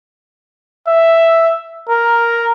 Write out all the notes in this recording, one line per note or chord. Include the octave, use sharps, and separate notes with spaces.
E5
A#4